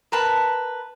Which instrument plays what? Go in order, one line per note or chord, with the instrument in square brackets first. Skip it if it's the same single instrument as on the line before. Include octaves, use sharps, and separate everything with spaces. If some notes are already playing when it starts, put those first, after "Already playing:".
[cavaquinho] A#4 B4 A5 B5